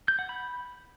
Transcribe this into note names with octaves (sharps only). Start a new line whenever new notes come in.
G6
F#5
B5